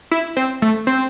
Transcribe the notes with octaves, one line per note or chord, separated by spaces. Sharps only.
E4
C4
A3
C4